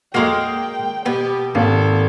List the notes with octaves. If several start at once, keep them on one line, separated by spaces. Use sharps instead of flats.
F2 G#3 A#3 F#4 G5
B2 B3 G4
G#1 A#3 A4